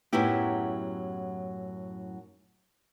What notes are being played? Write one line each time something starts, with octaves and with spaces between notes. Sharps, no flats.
F#2 A2 F#3 B3 E4 G4